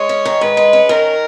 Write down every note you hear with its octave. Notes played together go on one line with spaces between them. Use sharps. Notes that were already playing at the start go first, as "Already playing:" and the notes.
Already playing: G#3 C#5
C#4
D#3
G#2 B4
G#3
C#4
D#3 A#4